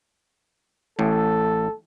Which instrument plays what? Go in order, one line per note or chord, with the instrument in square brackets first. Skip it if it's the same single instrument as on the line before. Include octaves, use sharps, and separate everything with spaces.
[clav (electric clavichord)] A1 A2 [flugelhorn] A4